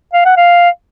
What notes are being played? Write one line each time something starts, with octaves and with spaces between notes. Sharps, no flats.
F5
F#5
F5